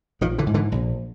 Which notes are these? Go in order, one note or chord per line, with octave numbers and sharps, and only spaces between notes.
A#1 D#3 F3
D3 E3
G#2
D3 E3
A#1